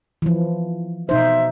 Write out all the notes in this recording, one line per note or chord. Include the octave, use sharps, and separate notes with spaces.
E3 F3
B2 D#4 C5 E5